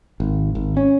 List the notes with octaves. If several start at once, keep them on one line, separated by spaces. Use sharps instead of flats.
G#1
G#1
C#4